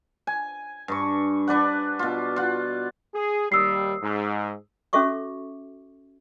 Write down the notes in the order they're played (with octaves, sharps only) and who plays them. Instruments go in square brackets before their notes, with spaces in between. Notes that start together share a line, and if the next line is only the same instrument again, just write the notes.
[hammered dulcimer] G#5
G2 C#6
D4 B4 D5 F#5
B2 F4
F4 F#5
[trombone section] G#4
[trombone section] D#2 G3 [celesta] D#6 E6 C7
[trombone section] G#2
[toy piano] C#4 F#4 A4 E5 C#6 D6